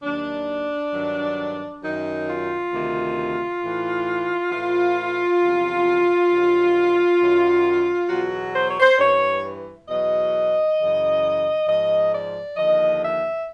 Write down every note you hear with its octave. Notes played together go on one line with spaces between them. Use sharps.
D#2 D#3 F#3 D4
G2 D#3 F#3
F#2 D#3 F#3 D#4
F4
D2 C3 D#3
A2 E3
A2 E3 F4
E2 C3 F3
G2 D#3 F#3
F#2 D#3 F#3
E2 B2 F#3 F#4
C5
C#5
C5
G2 E3 C#5
E2 B2 F#3 D#5
F#2 C#3 E3
G#2 F3 D#5
D5
D#2 D3 F3 D#5
E5